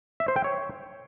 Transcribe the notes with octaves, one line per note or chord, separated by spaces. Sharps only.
E5
C5
G5
C#5